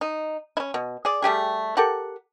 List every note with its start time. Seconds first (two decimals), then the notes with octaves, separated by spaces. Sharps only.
0.01 D#4
0.57 C#4 E4
0.74 B2
1.05 G#4 D5
1.22 G3 A3 G4 G#4
1.77 G4 A4 A#4 F#5